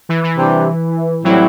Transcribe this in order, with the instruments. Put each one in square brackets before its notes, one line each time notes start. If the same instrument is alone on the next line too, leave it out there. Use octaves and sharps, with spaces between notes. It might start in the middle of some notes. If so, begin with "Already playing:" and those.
[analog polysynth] E3
E3
[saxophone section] C3 G3 D4 G4
[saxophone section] A2 G3 C4 E4 [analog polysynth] F#3